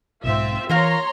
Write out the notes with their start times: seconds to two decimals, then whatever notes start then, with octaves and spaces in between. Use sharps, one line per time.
0.24 B1 G#2 C4 F4 E5
0.69 E3 F4 A#4 C#5 F5 A#5 C6